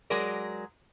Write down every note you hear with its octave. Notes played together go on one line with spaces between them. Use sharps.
F#3 G#3 G#4 A#4 D5